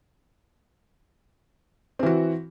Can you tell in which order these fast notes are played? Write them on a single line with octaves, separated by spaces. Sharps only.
C4 E3 F#4